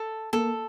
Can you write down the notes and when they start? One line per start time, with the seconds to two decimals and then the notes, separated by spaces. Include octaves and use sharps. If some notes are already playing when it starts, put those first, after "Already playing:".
Already playing: A4
0.33 A#3 A4